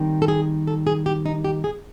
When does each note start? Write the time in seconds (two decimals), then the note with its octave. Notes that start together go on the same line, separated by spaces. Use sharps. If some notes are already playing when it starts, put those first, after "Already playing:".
Already playing: D#3 G3 C4
0.22 A4
0.28 G#4
0.67 A4
0.87 G#4
1.06 G4
1.26 D#4
1.45 G4
1.64 G#4